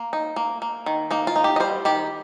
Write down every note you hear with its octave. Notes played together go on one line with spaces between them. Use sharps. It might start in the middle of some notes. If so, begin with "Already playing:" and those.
Already playing: A#3
D#4
A#3
A#3
D#3
A#3 D#4
F4
D#4
G4
D#5
G3 C5
D#3 G4